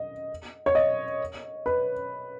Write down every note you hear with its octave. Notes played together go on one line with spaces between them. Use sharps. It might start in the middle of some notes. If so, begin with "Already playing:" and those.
Already playing: D#5
C#5
D#5
B4